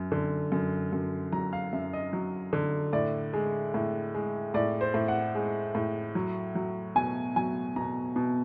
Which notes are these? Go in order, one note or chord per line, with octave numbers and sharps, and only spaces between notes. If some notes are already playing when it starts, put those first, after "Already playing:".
Already playing: F#2
D3
F#2
F#2
F#3 A#5
F5
F#2 E5
D#5
F#3
D3
A2 D5
G#3
A2
G#3
A2 D5
C5
A2
F#5
G#3
A2
F#3
F#3
B2 G#5
F#3 G#5
B2 A#5
B2